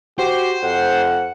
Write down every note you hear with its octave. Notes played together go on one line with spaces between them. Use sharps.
F#4 G4 C5
F2 F#5